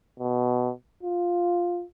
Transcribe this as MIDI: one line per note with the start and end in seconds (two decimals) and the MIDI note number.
0.20 0.71 47
1.03 1.84 65